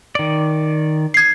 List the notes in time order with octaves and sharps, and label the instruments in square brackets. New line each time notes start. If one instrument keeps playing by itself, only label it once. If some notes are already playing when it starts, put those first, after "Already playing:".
[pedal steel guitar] D#3 D5
[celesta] G#6 C7